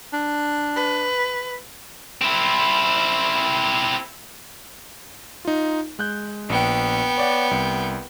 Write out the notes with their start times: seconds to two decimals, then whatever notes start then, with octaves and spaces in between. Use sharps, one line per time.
0.13 D4
0.76 B4
2.22 C4 E4
5.45 D#4 F4
5.99 G#3 F#6 G6
6.50 A#1 B3 G5 C#7
7.18 C#5 D5 F#5
7.51 C2